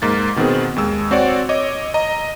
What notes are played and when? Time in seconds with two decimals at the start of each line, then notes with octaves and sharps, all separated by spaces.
0.02 G#2 A#3 A6
0.36 B2 D#3 B3 C4 G#4
0.76 D#2 G#3 E6
1.11 C4 F#4 C#5 D5
1.49 C#5 D#5 D6
1.94 D#5 A#5